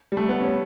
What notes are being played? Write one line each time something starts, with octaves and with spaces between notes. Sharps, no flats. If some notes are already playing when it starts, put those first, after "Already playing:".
G3
A3
B3
C#4